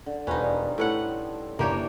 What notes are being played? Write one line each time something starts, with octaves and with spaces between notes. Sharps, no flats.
D3
E1 D#3 F3 G3 C#4 D#4 B4
A2 A4 B4 C#5 F#5
F#1 E3 A#3 D4 G4 C#5 A#5